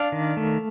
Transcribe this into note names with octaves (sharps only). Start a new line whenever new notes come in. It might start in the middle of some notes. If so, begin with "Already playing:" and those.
Already playing: D4 D5 F5
D#3
A3